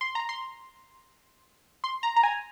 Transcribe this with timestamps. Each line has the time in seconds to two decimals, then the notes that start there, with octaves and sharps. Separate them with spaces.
0.01 C6
0.15 A#5
0.29 C6
1.84 C6
2.03 A#5
2.16 A#5
2.23 G#5